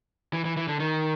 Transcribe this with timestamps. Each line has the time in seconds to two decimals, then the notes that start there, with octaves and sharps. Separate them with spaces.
0.33 E3
0.45 E3
0.57 E3
0.68 D3
0.80 D#3